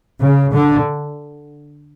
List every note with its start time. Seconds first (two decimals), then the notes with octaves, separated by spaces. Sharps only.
0.21 C#3
0.54 D3